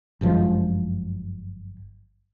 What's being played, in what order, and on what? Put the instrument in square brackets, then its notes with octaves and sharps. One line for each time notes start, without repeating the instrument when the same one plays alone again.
[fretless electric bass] G1 F#2 F3 G#3